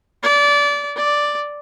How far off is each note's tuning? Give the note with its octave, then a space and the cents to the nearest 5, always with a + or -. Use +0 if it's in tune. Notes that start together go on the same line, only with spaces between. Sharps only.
D5 -25
D5 +0